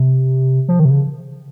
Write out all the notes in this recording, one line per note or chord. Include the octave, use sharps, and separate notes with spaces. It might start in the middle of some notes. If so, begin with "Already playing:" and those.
Already playing: C3
F3
D#3
C3
C#3